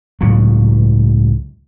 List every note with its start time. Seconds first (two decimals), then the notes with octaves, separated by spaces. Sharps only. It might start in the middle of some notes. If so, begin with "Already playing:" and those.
0.21 C#2 A2 F#3